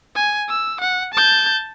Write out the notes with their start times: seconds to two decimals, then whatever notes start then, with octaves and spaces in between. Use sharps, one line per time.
0.16 G#5
0.49 E6
0.81 F#5
1.14 A5 G6